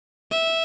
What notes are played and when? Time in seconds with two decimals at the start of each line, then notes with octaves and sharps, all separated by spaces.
0.31 E5